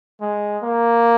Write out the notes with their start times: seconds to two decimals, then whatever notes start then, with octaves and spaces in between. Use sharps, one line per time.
0.22 G#3
0.64 A#3